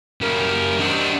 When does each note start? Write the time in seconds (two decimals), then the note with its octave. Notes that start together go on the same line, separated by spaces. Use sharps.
0.21 F#2 C#3 G3 A#4
0.80 C3 D#3 D4 F#4